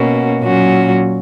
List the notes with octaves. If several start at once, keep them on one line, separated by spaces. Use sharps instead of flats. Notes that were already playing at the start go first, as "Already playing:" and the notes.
Already playing: B2 A#3 C#4 F#4
A#2 F#3 C#4 F#4